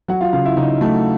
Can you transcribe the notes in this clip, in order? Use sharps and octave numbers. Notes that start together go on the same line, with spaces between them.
F#3 F#4 F#5
F4 F5
C#3 F4 F5
E4 E5
C#3 D#4 D#5
F#3 A3 A4